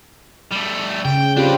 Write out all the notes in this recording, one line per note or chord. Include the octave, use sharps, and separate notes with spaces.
G3 A3
C#3 G5
C4 D4 F4 G4 B4